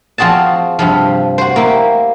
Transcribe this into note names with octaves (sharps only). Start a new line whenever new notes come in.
F3 C4 F#4 G#4 A5
G2 C3 F3
F#4 C5
A#3 E4 G4